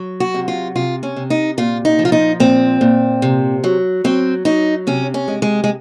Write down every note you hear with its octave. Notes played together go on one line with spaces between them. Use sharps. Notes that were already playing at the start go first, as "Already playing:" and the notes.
Already playing: F#3
F#4
C3
F4
C3 F4
C#4
C3
D#4
A#2 F4
D#4
F3
F4
D#4
A#2 C4
A#2
C3
F#3
F#3 C4
F#3 D#4
C3 C#4
C#4
G#3
G#3
G#3